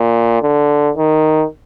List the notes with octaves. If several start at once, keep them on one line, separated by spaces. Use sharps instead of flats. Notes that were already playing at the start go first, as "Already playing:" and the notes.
Already playing: A#2
D3
D#3